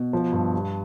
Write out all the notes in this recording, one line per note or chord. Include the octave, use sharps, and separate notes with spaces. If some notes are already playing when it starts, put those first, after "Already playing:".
Already playing: B2
F3
G2
G3